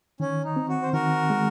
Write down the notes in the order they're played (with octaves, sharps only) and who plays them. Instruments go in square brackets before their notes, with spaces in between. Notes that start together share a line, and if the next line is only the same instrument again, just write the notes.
[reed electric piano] D#3 [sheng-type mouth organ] C#4
[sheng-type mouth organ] D#4
[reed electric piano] C4
[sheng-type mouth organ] F#4
C5
[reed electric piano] D#3 [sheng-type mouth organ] F#4 A#4
[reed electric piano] G#3